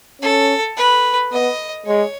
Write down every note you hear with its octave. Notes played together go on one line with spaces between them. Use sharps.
C#4 A4
B4
B3 D#5
G#3 C#5